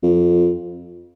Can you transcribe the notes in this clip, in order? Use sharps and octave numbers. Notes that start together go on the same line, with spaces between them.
F2